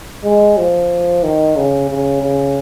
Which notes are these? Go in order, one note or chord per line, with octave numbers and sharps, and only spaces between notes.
G#3
F3
D#3
C#3
C#3
C#3